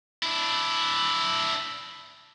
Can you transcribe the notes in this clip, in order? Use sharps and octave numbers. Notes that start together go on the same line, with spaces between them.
D4 E4